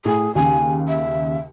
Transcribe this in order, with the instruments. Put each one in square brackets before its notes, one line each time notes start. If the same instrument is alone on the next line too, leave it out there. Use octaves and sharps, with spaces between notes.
[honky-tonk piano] A2 [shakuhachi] G#4
[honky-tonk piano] D#2 C#3 [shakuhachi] G#5
[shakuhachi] E5